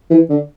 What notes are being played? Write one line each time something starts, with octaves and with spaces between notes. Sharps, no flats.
E3
D3